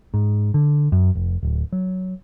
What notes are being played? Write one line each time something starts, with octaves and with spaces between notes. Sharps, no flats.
G#2
D3
F#2
F1
D1
F#3